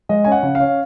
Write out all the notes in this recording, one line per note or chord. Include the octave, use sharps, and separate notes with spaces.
G#3 D#5
C#4 G#5
F#5
C#3
F5
C#4